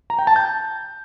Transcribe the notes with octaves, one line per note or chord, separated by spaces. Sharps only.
A#5
G5
A5
G6